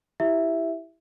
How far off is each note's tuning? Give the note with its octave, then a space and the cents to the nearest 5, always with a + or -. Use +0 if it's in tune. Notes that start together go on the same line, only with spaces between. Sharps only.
E4 +0 G4 +0 E5 +0